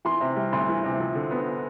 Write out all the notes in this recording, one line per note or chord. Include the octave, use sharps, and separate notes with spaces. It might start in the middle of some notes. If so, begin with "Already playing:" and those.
E3 C6
C3
G3
D2 C6
E3
C3
F3
D3
B3